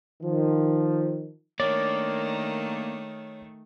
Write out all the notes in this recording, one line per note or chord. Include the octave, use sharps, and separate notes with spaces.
D#3 F3
D#3 A3 A#3 D4 C#5 D5